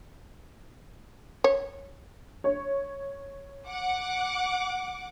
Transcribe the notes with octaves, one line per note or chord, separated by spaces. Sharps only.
C#5
C#5
F#5 D6